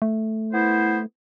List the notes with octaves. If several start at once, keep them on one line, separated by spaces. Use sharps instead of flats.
A3
B3 E4 C5